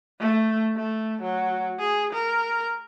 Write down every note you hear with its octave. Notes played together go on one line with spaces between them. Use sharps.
A3
A3
F#3
G#4
A#4